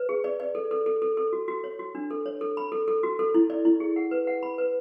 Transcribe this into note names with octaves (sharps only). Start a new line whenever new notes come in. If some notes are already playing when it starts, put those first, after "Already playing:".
Already playing: B4
G#4
D5
D5
A4
A4
A4
A4
A4
F#4
F#4
C#5
F#4
D4
A4
C#5
A4
B5
A4
A4
F#4
A4
E4
D5
E4
G#4
F#5
B4
F#5
B5
B4